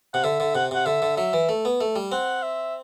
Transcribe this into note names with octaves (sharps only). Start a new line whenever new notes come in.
C3 F#5
D3 E5
D3
C3 F#5
C3 F#5
D3 E5
D3
F#3 E5
E3
A3
B3
A3
G3
C4 F#5
E5